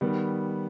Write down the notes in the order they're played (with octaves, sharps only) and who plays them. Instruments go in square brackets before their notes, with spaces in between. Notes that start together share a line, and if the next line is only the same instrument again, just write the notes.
[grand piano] D#3 G3 B3